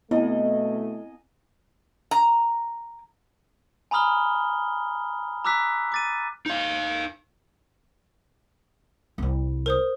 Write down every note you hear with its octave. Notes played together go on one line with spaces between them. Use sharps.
B2 A3 B3 C4 E4 D#5 G#5
A#5
G#5 A#5 B5 D#6 F6 G7
A#5 D6 E6 F#6 B6
D6 A6 D#7
D#4 F5
C2 G3
A#4 C5 D#6